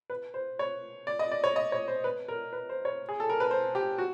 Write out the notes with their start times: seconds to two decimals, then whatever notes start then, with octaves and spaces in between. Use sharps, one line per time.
0.10 B4
0.34 C5
0.59 C#5
1.07 D5
1.19 D#5
1.31 D5
1.44 C#5
1.56 D#5
1.72 C#5
1.88 C5
2.04 B4
2.28 A#4
2.53 B4
2.69 C5
2.85 C#5
3.09 G#4
3.20 A4
3.30 A#4
3.40 B4
3.51 C5
3.75 G4
3.98 F#4